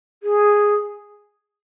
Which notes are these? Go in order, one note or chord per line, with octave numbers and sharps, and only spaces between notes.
G#4